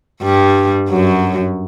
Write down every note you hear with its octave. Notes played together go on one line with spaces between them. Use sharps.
G2 G3
F#2 F#3